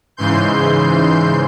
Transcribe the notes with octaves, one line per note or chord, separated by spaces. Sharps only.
G#2 C#3 E3 C6 G6